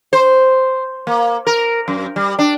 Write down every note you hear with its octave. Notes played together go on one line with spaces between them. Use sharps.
C5
A#3
A#4
F#2
G3
D4